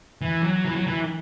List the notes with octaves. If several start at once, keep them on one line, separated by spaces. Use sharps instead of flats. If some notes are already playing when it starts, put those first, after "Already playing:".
E3
F#3
E3
F#3
E3